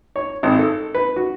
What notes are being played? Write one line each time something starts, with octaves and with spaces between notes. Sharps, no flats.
C#5
G#1
A4
B4
F#4